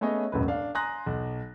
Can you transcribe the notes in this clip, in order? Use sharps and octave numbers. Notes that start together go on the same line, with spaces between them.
A3 B3 C#4 G#4 C#5 D#5
E1 A1 F#2 B4
D4 F5
G#5 A#5 C6 D#6 F#6 A#6
B1